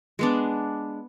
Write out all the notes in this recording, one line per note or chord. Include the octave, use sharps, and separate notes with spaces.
G#3 B3 D4